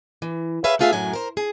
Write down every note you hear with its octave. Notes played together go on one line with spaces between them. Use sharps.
E3
G#4 B4 C#5 E5 F5
A3 B3 F4 G#4 E5 F5
F#2 A2 F#3 G#5
A#4 C5
G#4